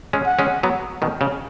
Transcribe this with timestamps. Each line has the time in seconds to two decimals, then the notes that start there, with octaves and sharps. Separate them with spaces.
0.13 G#3 C#4
0.26 F#5
0.39 G#3 C#4
0.63 F#3 B3
1.02 B2 D#3
1.21 C#3